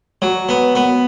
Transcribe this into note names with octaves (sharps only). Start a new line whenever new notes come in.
F#3
B3
B3